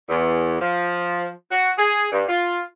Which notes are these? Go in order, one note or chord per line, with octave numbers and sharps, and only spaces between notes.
E2
F3
F#4
G#4
G2
F4